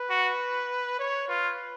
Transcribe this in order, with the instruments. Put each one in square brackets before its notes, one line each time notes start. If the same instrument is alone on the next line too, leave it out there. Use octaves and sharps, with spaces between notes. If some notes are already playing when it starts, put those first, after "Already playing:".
Already playing: [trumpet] B4
[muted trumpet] F#4
[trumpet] C#5
[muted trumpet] F4 [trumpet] B4